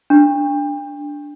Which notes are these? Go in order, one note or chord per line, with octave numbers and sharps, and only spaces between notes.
D4